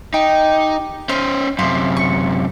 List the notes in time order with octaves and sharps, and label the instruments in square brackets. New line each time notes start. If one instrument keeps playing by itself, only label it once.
[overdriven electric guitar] D#4 [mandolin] G4
[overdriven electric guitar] C#4 C5 [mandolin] D#5 F6
[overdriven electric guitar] F#2 C3 [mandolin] F5 C6
[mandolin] C#6